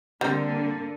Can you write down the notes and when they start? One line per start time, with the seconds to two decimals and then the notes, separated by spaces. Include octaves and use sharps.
0.21 D3 G3 A#3 C4